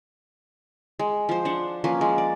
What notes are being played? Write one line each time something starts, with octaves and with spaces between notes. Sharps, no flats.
G#3
F3 C5
F3 D4 F#5
F3 A#3 C#4 B4
G#3
D5